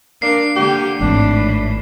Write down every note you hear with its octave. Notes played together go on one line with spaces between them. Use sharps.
A#3 D4 C7
D3 A#3 G4
G#1 A2 E3 D4